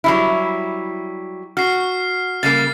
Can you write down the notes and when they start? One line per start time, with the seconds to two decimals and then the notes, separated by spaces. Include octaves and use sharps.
0.04 F#3 G3 E4
1.57 F#4 F6 C7
2.43 C#3 G3 A#3 A6 C7